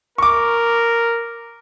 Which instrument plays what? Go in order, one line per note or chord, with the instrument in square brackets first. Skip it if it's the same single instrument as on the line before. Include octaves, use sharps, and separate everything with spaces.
[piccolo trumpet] A#4 [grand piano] C#6 D6